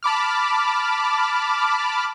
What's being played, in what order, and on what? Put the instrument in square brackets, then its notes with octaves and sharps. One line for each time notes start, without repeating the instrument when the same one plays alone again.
[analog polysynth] A5 B5 D6 F6